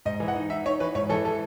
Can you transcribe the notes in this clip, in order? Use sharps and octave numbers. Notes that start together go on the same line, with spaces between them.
G#2 D#5
E3
F#5
D#4
D#4 E5
D#4 C#5
E3 B4
G#2 C#5
E3 A4
E3 A4